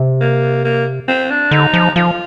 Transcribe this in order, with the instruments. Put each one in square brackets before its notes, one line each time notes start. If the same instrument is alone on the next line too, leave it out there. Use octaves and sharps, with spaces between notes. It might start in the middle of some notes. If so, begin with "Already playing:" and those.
Already playing: [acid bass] C3
[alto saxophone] A#3
A#3
C4
D4
[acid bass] D3 [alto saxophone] D#4
[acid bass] F3
[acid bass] F3 [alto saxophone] F4